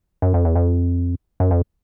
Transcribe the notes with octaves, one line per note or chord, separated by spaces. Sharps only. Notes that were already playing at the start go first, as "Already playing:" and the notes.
F#2
F2
E2
F2
F#2
F2